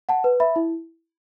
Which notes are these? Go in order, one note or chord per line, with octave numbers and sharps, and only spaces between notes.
F#5 A5
B4
E5 B5
E4